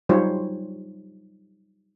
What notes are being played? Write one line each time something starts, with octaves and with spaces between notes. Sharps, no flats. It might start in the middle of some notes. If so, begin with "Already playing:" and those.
F#3 G3 D#4 F4 C5 C#5